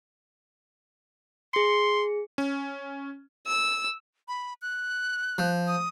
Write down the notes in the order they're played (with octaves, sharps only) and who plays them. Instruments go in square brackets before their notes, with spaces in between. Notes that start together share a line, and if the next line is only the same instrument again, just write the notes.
[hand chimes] G#4 C#7 [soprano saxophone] C6
[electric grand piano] C#4
[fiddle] E6
[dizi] B5
F#6
[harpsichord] F3
[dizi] D#6